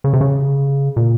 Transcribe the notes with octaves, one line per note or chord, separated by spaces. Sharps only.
C#3
C3
C#3
A#2